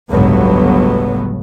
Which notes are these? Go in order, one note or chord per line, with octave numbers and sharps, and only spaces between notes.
G1 C#2 A2 F#3 B3